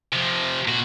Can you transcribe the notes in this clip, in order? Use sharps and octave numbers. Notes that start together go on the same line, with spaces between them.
C3 F3
A#2 F#4